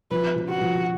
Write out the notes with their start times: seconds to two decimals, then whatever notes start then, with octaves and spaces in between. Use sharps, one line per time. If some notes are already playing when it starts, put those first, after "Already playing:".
0.11 F3 B4
0.36 F3
0.49 F#4
0.61 F3